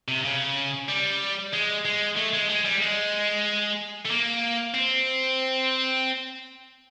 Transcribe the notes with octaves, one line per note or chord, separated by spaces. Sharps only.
C3
C#3
G3
G#3
G#3
A3
G#3
G#3
G3
G#3
A3
A#3
C4